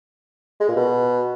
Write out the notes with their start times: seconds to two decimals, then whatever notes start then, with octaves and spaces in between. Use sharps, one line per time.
0.60 G#3
0.68 A#2
0.76 B2